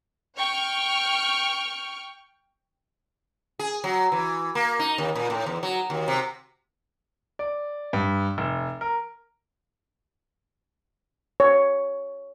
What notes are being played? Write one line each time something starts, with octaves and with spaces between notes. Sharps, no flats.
G5 C#6 F6
G#4
F#3
E3
A#3
D#4
D#2
A#2
A2
E2
F#3
D#2
C3
D5
G2
F1
A#4
C#5